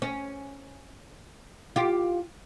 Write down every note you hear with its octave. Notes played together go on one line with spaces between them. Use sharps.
C#4
F4 G4